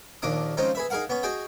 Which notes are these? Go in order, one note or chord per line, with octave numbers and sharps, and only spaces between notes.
A#1 D#2 D4 D6 D#6
C#3 F3 G#3 C4 D#4
G#4 B4 E5
D#4 G#4 A#4 F5 F#5
B3 C#4
F#4 G#4 D#5 G5